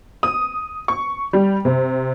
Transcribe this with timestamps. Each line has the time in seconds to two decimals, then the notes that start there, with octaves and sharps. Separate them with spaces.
0.23 D#6
0.88 C#6
1.33 G3
1.65 C3